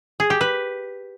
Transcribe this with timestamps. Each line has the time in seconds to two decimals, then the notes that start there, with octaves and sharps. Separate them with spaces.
0.20 G#4
0.30 G4
0.41 B4